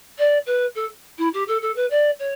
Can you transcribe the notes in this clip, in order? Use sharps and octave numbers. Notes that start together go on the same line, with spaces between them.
D5
B4
A4
E4
G4
A4
A4
B4
D5
C#5